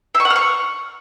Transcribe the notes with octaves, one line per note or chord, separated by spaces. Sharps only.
E5
C#6
F#5
F6
C#6